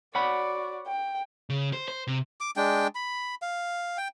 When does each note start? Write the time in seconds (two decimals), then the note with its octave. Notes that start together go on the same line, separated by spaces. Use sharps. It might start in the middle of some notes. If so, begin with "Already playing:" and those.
0.15 F#4 C#5 D5 F#5 B5
0.87 G5
1.50 C#3
1.73 C5
1.88 C5
2.07 C3
2.41 D6
2.57 G#3 D4 G5
2.95 B5
3.42 F5
3.97 G5